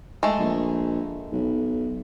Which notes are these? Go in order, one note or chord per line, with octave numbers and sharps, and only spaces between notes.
G#3 A3
A#1
B1